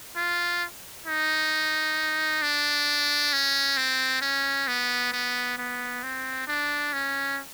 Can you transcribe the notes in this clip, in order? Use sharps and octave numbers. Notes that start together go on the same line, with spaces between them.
F4
D#4
D4
C#4
C4
C#4
B3
B3
B3
C4
D4
C#4